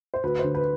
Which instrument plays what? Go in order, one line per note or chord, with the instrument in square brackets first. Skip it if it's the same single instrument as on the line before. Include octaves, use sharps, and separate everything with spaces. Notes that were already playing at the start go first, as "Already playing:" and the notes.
[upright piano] C5
D2 B4
C5
D3
B4